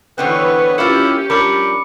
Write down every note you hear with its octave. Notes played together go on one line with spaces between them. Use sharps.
B2 D3 E3 B3 C4 B4 C#5
A#3 C#4 E4 F4 G4 C#7
F3 G3 D4 A#4 B5 D6 C#7